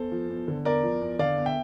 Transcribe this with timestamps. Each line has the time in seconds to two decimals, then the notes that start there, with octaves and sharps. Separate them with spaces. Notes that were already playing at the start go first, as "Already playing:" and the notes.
Already playing: E2 A4 C5
0.12 F3
0.29 E2
0.48 D3
0.65 E2 A#4 D5
0.83 F3
1.01 E2
1.19 D3 D5 F5
1.37 E2
1.46 E5 G5